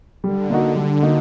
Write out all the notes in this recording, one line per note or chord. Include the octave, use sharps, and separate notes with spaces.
D3 G3
A#3 D#4 F#4
G3
A#3 D#4 F#4